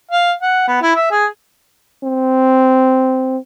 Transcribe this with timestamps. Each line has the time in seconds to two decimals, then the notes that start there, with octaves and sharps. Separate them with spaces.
0.11 F5
0.42 F#5
0.67 B3
0.82 E4
0.95 E5
1.11 G#4
2.04 C4